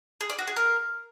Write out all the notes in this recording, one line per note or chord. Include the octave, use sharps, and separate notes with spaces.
G#4
D5
F#4
G#4
A#4